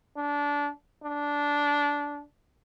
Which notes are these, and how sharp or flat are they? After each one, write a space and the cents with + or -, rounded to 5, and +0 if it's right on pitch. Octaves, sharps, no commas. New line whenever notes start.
D4 -20
D4 -15